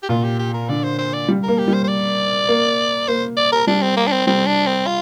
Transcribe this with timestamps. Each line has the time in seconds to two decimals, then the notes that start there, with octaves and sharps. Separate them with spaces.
0.03 G4
0.09 A#2 F4
0.24 G4
0.39 G4
0.54 A#4
0.69 D3 D5
0.83 C5
0.98 C5
1.13 D5
1.28 G3
1.43 A#3 A#4
1.58 G4
1.68 G3
1.74 C5
1.84 C5
1.88 D5
2.48 A#3
3.08 A#3 C5
3.37 D5
3.52 A#4
3.67 G3 D4
3.82 C4
3.97 A#3
4.07 D4
4.12 C4
4.27 G3 C4
4.47 D4
4.67 C4
4.86 F4